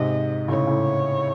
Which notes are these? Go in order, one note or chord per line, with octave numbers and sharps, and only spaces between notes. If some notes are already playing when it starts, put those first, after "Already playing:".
Already playing: G#2 C3 D#5
A2 C#3 C#5
A2 C#3